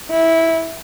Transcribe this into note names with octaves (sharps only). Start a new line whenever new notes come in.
E4